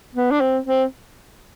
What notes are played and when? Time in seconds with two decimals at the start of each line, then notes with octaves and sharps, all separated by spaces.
0.15 B3
0.31 D4
0.41 C4
0.66 C4